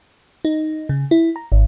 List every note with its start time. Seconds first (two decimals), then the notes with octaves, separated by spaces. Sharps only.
0.45 D#4
0.89 C#3
1.11 E4
1.36 A#5
1.52 G#1